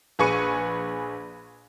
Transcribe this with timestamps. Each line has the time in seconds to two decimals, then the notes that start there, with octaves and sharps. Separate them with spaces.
0.19 A#1 G#4 B4 C#6 C#7 D#7